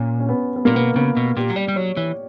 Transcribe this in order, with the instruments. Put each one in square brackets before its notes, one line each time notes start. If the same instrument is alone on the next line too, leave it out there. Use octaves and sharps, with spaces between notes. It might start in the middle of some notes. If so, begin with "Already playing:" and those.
Already playing: [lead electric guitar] A#2 [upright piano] C#4
[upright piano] C#4
B3
B3
[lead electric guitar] A#2 [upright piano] A#3
[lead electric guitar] B2 [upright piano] B3
[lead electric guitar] C#3 [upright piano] B3
[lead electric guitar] B2
[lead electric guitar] A#2 [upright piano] G4
[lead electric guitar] F#3
[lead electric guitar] G3 [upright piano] D5
[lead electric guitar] G3
[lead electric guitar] F#3 [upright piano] C#5
[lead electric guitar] E3 [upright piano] C#5